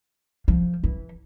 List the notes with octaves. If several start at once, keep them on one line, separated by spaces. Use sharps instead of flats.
F3
E3